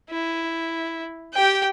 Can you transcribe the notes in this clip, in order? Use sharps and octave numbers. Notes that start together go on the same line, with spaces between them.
E4
G4 G5